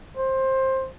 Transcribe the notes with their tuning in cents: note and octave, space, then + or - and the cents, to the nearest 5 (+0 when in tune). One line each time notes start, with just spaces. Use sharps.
C5 +15